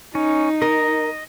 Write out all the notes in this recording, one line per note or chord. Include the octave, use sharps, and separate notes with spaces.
C#4 D#4
A#4 D#5